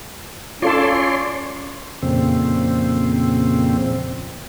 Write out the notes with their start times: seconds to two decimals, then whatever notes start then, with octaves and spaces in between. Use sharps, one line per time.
0.62 C#4 F4 A4 C#5 D5 A5 C6
2.03 F2 A#2 C#3 C4